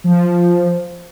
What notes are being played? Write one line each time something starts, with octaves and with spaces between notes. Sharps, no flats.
F3